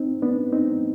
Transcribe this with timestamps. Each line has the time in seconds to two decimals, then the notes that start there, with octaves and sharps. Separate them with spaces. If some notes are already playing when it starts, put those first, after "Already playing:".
Already playing: C4 D#4
0.22 B3 D4
0.53 C4 D#4